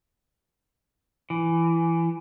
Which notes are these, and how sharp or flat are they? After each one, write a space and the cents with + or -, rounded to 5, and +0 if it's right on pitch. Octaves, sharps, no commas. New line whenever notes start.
E3 +15